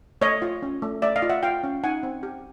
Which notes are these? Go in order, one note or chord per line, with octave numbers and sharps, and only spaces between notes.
A3 C#5 D#5
F4
C#4
A3
A3 D5 E5
D#5 F5
F4
E5 F#5
F4 F5 G5
C#4
D#4 F#5 G#5
C4
G4